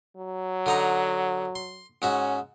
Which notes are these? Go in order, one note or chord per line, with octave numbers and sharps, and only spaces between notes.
F#3
D3 D#4 A#5
C6
G#2 C#4 F#4 E5